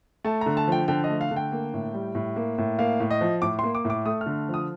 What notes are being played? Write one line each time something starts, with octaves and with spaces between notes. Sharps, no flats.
A3 A5
D3 A#5
A5
F3 G5
D3 G5
D#5
A3
F5
D3
G5
A#3
A2
G3
A2
A#3
A2
A#3 F5
A2
D#5
F3
A2 D6
A#3 C6
D6
A2
D6
A3 D#6
F6
D3
F3
D#6